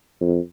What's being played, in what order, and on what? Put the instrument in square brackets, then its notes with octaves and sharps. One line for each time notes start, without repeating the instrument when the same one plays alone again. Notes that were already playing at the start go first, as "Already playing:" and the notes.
[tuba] F2